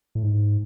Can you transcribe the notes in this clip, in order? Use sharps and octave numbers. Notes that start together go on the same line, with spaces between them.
A2
G#2